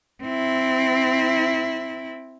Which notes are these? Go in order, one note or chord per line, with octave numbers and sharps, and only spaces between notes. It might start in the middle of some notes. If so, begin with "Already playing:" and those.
C4 E4